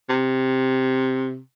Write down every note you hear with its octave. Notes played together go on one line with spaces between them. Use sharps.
C3